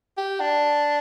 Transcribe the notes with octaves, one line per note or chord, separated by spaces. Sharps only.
G4
D4